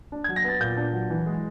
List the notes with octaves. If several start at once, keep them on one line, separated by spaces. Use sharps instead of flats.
D4
G#6
F#3
A#6
B3 A6
A#2 G6
D4
F#3
E3
G#3